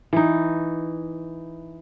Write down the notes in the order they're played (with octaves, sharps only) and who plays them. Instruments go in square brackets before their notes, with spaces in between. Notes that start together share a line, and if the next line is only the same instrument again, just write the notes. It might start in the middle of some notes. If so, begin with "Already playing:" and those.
[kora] E3 D#4